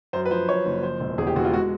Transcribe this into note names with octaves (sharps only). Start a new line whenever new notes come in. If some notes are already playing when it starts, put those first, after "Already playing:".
F#2 C5
B4
F3 C5
F#2 C#5
F#1
F3 C5
E1
E2 G#4
G4
E1 F#4
F4
G#3 F#4